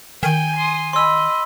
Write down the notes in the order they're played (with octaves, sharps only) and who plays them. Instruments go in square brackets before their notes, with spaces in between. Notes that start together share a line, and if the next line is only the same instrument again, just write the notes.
[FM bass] D#3 [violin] G5 G6 [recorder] G#5
[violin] C6 D#6
[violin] D#5 B5 [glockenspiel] C6 E6